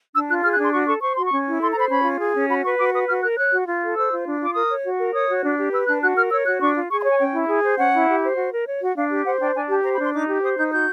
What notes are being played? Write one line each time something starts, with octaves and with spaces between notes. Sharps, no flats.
D4 E6
F4 F#6
G#4 F6
F#6
D4 C6
F#4 C#6
A4 C#6
C5 C#6
F#4 C6
C#6
C#4
E4
A4 C6
A#5
C5 B5
C#4 B5
F4
G#4
C#4
F#4 B5
B4 C#6
F#4 D6
B4 D#6
F#4 F6
A#4 F#6
C#5 F#6
F#4
F4
A4
C5 E6
F4
D4
F4 D6
A#4 D#6
C#5
F#4
A#4
C#5 D#6
F#4
D4
G4
B4 E6
D4 F#6
F#4 F#6
A#4 F6
C#5 E6
F#4 F#6
D4 C#6
F4
G#4 C#6
C6
C#5 G#5
C#4 G5
E4
G#4
C5
C#4 F#5
E4
G4
C5
F#4
A#4
C#5
F#4
D4 F5
G4
C5 F#5
D4 G5
D4 G#5
G4 A5
C5 A#5
B5
D4 C6
D#4 D6
G4
C5 D#6
D#4 G6
F#4 G6